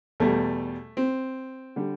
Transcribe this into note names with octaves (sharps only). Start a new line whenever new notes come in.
E2 B2 G3 A3
C4
D3 G3